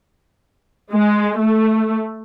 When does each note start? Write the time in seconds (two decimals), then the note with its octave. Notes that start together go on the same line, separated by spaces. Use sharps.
0.93 G#3
1.38 A3